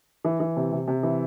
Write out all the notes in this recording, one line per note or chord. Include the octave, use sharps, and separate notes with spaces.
E3
E3
C3
C3
C3
E3